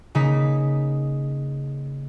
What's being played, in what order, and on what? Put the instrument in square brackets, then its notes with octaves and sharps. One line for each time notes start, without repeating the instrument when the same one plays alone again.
[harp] C#3 A#3 D#4 B6